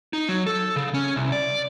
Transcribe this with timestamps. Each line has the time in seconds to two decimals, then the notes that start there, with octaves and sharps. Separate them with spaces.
0.13 D#4
0.29 F#3
0.46 A4
0.76 C#3
0.94 C#4
1.16 C2
1.32 D5